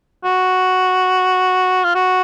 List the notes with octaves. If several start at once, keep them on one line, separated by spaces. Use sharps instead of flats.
F#4
F4
F#4